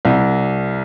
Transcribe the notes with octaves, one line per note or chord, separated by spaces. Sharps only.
C2